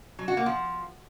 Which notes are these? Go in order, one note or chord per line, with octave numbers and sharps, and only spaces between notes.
F#3
F#4
A#3
F3